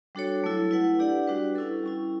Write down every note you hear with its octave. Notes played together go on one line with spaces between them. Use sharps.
G3 D4 F#4 A4 C#5
F#3 A3 E4 A4
E4 B4 F#5
D4 G4 D5 F#5
G3 D4 F#4 B4
C#4 E4 A4
G3 C#4 E4